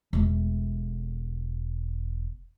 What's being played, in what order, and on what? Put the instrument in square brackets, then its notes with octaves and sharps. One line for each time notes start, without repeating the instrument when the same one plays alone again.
[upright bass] E1 A3